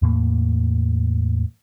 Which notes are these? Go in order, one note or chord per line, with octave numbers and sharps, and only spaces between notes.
E2 A2 A#3